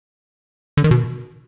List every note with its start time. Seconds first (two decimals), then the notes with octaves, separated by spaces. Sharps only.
0.77 D3
0.84 D#3
0.91 B2